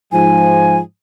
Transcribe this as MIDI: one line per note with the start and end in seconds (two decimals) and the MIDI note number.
0.12 0.78 44
0.12 0.78 53
0.12 0.77 80